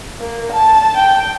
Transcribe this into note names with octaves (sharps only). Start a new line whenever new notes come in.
A#3
A5
G5